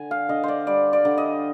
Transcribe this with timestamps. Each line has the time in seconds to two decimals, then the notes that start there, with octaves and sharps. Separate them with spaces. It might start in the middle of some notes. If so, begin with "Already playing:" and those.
Already playing: D3 G#5
0.11 F5
0.29 D3 D#5
0.43 C5 D5
0.67 G3 D5
0.93 D5
1.05 D3
1.18 D#5